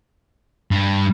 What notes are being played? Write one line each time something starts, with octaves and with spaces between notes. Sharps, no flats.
G2